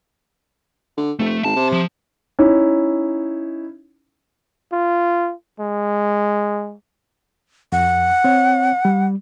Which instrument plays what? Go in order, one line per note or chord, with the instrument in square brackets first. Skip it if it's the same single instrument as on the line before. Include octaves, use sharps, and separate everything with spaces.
[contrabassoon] D3
[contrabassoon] F1 [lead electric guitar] A3
[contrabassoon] G#1 [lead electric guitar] A5
[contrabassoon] C3
[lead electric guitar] F3
[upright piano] C#4 D#4 E4
[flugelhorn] F4
G#3
[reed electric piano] F2 [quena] F#5
[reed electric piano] C4 C#5
G3